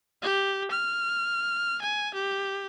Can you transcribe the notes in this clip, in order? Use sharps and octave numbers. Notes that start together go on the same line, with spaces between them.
G4
F6
G#5
G4